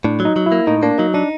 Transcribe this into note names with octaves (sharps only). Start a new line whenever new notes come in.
A2 D4
F#3
D#4
F#3
E4
A#3
A2 D#4
A#3 D4
F#3 D#4
D4 D#4